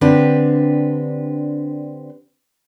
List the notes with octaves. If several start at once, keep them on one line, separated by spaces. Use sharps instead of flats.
D3 C4 D4 G4 B4